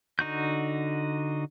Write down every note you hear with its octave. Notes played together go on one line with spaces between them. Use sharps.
D3 D#4 F#4 G6